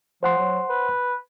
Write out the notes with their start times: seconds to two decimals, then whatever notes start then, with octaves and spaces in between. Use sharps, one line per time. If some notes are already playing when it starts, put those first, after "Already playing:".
0.23 F3 C5 F#5 C6
0.38 F#3
0.69 B4